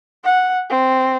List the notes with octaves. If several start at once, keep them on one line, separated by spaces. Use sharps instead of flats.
F#5
C4